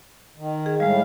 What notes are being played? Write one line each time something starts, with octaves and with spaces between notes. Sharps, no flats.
D#3
G#4
A2 G3 G#3 F5